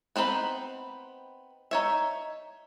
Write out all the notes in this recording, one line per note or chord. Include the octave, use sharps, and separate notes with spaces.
B3 C4 D#4 A#4 B5
D#4 C#5 E5